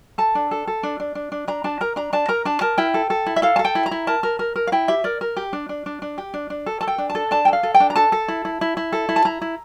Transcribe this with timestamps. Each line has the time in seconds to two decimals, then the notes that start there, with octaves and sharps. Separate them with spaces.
0.18 A4 A5
0.35 D4
0.51 A4
0.68 A4
0.83 D4
1.00 D4
1.15 D4
1.32 D4
1.48 D4 A#5
1.64 D4 A5
1.81 A#4 A#5
1.96 D4 A#5
2.13 D4 A5
2.28 A#4 A#5
2.45 D4 A5
2.61 A#4 A5
2.78 E4 G5
2.94 A4
3.10 A4
3.27 E4
3.36 E5
3.42 A4 F5
3.56 A5
3.59 A4
3.65 G5
3.75 E4
3.86 A#5
3.91 E4
4.07 A#4 A5
4.23 A#4
4.39 A#4
4.56 A#4
4.67 F5
4.72 E4 G5
4.88 G4 E5
5.04 A#4 D5
5.21 A#4
5.37 G4
5.53 D4
5.69 D4
5.86 D4
6.02 D4
6.18 G4
6.34 D4
6.50 D4
6.66 A4
6.81 A4 A5
6.88 G5
6.98 D4
7.10 A5
7.15 A4
7.31 D4 A5
7.45 G5
7.48 A4
7.53 F5
7.63 A4
7.74 G5
7.80 D4
7.90 A#5
7.96 A4 A5
8.12 A4
8.28 E4
8.45 E4
8.61 E4
8.77 E4
8.93 A4
9.09 E4
9.16 A5
9.25 E4 A#5
9.42 E4